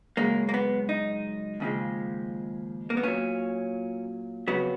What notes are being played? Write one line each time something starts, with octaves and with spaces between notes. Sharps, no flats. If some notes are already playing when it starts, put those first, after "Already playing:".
F#2 C#3 G#3 A#3
A#3
B3
D#4
D#2 C#3 F3 G#3
A#3
B3
A#2 F#3 C#4
F2 C#3 F#3 B3